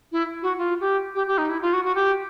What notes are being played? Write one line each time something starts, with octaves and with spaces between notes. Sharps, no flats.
E4
F#4
F4
G4
G4
G4
D#4
E4
F4
F#4
F#4
G4